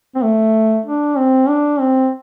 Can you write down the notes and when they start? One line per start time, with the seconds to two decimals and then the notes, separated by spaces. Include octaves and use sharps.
0.16 C4
0.23 A3
0.86 D4
1.17 C4
1.49 D4
1.80 C4